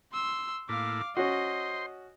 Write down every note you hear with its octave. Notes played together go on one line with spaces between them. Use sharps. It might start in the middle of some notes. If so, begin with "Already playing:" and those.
C6 E6
A2 A#3 E4 F5 D6
C#4 F#4 C5 D#5 C6